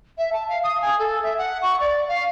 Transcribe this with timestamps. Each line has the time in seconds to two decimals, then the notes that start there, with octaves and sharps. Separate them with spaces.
0.18 E5
0.33 A5
0.49 F5
0.64 D#6
0.82 G#5
0.99 A4
1.23 E5
1.38 F#5
1.62 C#6
1.80 D5
2.08 F5